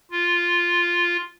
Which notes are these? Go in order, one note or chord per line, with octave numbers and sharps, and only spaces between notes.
F4